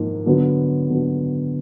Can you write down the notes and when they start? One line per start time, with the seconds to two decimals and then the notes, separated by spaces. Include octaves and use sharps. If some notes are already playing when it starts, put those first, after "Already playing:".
Already playing: G#2 F3 A#3 D#4
0.26 D3 F#3 B3
0.90 D3 F#3 B3